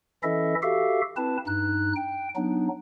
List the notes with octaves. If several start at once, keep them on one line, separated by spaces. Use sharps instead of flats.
E3 C#4 E4 A4 D#5 E5
F#4 G4 A4 E5 F5
C4 E4 B4 A5
G2 D#4 F#6
G5
F#3 B3 D4 D#4